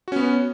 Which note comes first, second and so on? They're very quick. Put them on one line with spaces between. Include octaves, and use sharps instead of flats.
F#4 C#4 B3